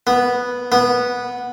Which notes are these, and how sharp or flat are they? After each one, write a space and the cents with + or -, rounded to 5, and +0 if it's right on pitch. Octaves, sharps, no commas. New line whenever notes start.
B3 -5
B3 -10